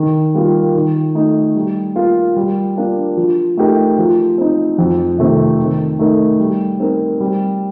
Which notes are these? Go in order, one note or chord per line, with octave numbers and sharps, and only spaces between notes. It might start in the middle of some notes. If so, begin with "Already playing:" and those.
Already playing: D#3
G3 A#3 F4
D#3
A3 D#4
G3
A#3 F4 A#4
G3
A#3 D4 F4
F3
A3 D#4 G4 A#4
F3
C4 D#4
F2
C3 D#3 A3 C4
D#3
A3 D#4 A#4
G3
C4 D#4 A#4
G3